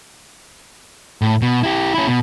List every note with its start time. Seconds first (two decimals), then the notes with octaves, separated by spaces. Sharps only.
1.22 A2
1.42 B2
1.63 E4 G4
1.95 C#4 E4
2.07 B2